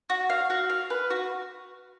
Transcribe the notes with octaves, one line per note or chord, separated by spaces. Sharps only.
F#4
F5
F#4
F5
B4
F#4